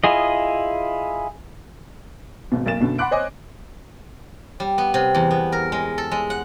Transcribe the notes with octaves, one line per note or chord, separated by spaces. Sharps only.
E4 F4 G#4 D#5
G#1 B2
B1 A#3 A6 E7
F#2 B2 D3
F#5 B5 C6 D6 F#6 D7
C5 C#5 D#5 G#5 D6
G3
B3
C3
E2
B3
A#4
G#3
A4
G#3
F#5